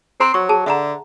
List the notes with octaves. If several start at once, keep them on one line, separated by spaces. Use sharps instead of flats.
C4 C5 A#5 C6
F#3 C#6
G#4 A5
D3 E5 F#5 A#5